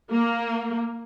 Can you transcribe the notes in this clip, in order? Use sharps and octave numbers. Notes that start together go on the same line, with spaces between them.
A#3